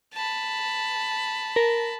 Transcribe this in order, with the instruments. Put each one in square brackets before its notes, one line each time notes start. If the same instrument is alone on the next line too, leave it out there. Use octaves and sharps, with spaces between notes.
[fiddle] A5 B5
[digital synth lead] A#4